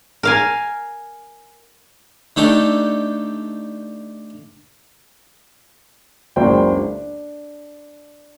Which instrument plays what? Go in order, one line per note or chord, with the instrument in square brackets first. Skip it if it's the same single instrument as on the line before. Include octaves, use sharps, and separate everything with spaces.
[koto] A#4 F5 G#5
[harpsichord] D3 A3 D4 D#4 G4 A4
[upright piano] F#1 C#2 F#3 C5 D5 G5
D4